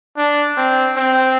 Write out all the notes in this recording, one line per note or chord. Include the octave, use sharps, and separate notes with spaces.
D4
C4
C4